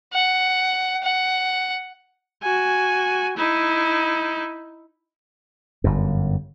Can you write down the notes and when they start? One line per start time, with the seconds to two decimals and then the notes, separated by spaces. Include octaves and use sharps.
0.14 F#5
1.03 F#5
2.43 F#4 G#5
3.37 D#4 E4
5.84 G1 F#2